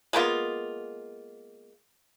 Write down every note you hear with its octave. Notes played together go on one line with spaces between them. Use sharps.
G#3 A#3 B3 F4